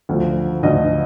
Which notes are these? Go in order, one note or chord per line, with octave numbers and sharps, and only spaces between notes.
D2 D3 F3
D2 D3 F3 D#5